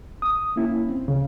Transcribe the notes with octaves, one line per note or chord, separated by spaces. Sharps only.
D#6
A#3 C#4 E4
C4
C#2 C#3